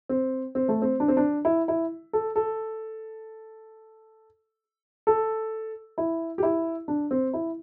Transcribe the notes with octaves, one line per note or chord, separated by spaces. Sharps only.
C4
C4
A3
C4
D4
C4
D4
E4
E4
A4
A4
A4
E4
G4
E4
D4
C4
E4